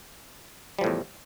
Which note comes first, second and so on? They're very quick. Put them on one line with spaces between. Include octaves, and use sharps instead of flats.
G3 F3 A2 E2